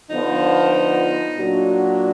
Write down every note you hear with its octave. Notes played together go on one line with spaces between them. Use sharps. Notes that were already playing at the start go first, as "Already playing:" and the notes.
D3 F3 B3 D#4
A#2 F#3 D4 F#4